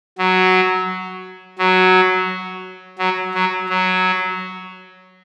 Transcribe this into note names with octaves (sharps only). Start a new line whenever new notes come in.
F#3
F#3
F#3
F#3
F#3